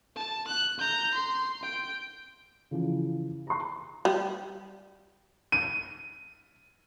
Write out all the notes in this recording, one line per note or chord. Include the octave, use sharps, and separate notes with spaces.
A5
F#6
A#5 G6
C6
G5
C#3 E3 F3
A#5 C6
G3
D#7